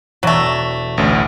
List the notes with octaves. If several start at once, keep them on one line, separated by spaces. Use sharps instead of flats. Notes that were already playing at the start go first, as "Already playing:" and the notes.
E1 F#3 A3 D5 A#6
A1 D2